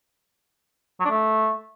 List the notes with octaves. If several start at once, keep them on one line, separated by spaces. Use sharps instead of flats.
F#3
D4
A3